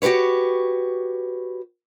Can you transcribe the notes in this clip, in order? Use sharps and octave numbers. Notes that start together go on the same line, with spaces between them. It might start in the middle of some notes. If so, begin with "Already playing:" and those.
F#4 G4 A4 B4 C#5